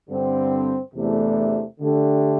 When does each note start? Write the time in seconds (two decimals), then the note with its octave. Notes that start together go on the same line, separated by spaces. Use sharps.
0.10 G2 D3 C4
0.94 E2 C3 A3 D4
1.80 D3 A3 D4 G4